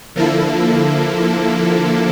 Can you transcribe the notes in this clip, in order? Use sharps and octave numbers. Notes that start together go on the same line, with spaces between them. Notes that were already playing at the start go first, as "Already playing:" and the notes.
D3 F3 A#3 E4 A4